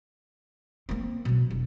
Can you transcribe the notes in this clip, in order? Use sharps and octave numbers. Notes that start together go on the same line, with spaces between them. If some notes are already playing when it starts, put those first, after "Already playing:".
A#3 C4
B2 F#3
E1